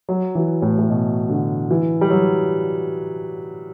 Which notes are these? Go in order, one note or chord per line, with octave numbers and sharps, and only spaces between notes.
F#3
E3
A2
A2
B2
D3
E3
G3
F#3